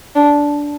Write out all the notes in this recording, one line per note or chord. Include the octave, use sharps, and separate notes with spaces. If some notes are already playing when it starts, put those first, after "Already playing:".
D4